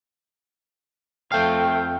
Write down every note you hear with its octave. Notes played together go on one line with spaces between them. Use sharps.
F2 A3 C4 F5 G5